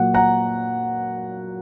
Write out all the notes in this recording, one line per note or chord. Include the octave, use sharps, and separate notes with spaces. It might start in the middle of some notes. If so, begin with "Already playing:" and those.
Already playing: A#2 F#3 F#5
F#5 A#5